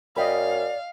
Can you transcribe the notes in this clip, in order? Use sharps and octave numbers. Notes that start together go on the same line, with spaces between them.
F#2 D5 D#5 F5 G5 B5